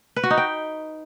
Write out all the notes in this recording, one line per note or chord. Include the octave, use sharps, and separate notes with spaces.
B4
F#4
D#4
G5